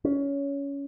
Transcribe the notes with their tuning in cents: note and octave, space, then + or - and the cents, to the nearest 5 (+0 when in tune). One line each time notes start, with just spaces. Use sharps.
C#4 +15